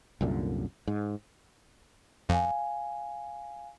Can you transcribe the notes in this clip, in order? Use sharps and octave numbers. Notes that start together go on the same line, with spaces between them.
C2 F#2 A#2 D3
G#2
F2 F5 G#5